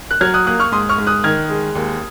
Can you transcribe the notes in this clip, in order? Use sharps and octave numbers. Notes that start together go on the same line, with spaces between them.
F#6
F#3 F6 G#6
D#6 F#6
A#3 D#6 F#6
C#6 F6
G#2 C6 D#6
C#6 F6
G#2
D#6 F#6
D#3 F6 G#6
G#3
D#2